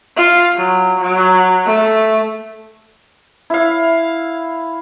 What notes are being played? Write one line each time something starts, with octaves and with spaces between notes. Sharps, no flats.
F4
F#3
F#3
A3
E4 F5